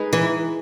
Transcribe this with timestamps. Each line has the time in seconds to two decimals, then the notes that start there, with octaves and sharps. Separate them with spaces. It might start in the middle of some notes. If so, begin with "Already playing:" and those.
Already playing: G#3 D#4 G#4 B4
0.13 E3